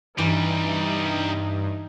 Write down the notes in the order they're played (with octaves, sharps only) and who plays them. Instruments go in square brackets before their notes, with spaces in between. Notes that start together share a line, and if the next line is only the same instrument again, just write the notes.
[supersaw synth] G2 [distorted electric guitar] C3 G3 [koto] E3 [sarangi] D#4